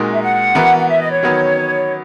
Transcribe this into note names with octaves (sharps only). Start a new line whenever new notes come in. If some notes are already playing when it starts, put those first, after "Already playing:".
Already playing: A#2 G#3 D#4 F#4 A#4
E5
F#5
E3 B3 F#4 A#4
F#5
E5
D#5
C#5
D#3 F#3 B3